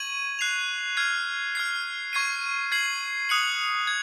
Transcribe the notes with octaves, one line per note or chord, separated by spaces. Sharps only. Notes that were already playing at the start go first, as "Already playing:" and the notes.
Already playing: C#6 G#6 D#7 F#7
F#6 C7 F7
F6 G#6 C7
F6 G#6 C7
C#6 G#6 C7 D#7
G#6 C7 F#7
D#6 F#6 C#7 F#7
G#6